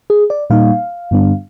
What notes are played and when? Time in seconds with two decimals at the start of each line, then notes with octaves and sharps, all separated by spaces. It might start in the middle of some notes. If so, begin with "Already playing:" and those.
0.10 G#4
0.30 D5
0.50 A#2 G3 A#3 D#4 F5
1.11 G2 D3 G3 B3 D4